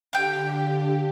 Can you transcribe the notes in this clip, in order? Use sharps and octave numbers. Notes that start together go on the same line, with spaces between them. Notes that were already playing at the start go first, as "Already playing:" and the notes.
D3 G4 F5 G5